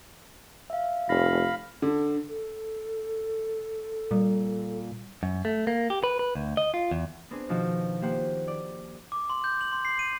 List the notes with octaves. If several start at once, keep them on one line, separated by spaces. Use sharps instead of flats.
E5 F5
F1 F5 B5 A#6
D3
A4
A#2 G3
F#2
A3
A#3
G4
B4
B4
D2
D#5
F4
E2
B3 C4 D4 G#4
B2 D#3 F3 D#4 F4 F#4
A#3 G4 C5 F#5
D5
D6
C6
G6
F#7
C6
C7
D#7